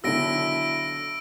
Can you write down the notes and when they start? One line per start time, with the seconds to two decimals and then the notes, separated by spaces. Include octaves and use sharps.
0.04 B1 D3 E4 E6 A#6 D7